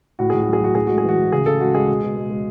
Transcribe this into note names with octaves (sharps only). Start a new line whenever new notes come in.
A2 F#4
A2 G#4
F#4
F#3
G#4
F#3 F#4
A2 G#4
G#3 F#4
G#4
E3
F#4
A2
C#3 G#4
C#3 A4
G#3 F#4
G#3 G#4
B2
B2
G#3
G#3